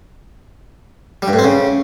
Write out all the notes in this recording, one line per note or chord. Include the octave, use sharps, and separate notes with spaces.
G3
G2
A2
C4
C#3